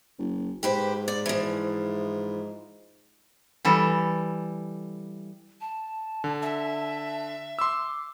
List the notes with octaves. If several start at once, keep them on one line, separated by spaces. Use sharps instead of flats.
F#1
G#2 G4 B4 C5
D5
E3 F3
E3 G3 A4
A5
D3
E5
C6 D6 E6